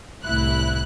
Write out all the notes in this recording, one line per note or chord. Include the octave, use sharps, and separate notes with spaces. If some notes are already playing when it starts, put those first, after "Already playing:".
C2 A2 E4 F#6